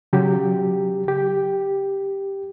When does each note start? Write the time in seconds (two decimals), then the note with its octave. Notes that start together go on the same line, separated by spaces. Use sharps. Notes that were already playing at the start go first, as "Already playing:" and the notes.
0.13 C#3 F#3 G4
1.08 G4